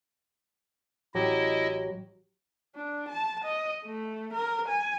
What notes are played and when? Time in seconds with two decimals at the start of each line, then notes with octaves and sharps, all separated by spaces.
1.15 A1 F#3 E4 G4 D#5
2.76 D4
3.09 A5
3.44 D#5
3.84 A3
4.33 A#4
4.68 G#5